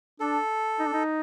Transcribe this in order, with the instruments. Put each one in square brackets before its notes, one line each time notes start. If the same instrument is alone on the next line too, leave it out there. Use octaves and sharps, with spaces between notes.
[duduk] D4 [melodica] A4
[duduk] D#4
D4
D#4